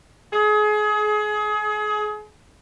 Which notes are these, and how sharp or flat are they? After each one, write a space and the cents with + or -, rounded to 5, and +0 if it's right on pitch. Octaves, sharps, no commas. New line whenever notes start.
G#4 +30